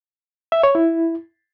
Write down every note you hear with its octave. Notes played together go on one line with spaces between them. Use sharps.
E5
C#5
E4